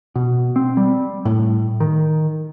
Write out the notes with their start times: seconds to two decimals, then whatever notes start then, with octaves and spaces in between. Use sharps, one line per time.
0.15 B2
0.56 C4
0.77 G3
1.25 A2
1.80 D#3